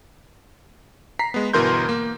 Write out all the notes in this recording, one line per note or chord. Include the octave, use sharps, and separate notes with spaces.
A#5 B6 C7
G#3 B3
G1 B2 E3 A#4 C6 G6
A#3